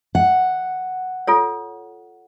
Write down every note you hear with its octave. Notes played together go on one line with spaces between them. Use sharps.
F#5
F4 A4 C#5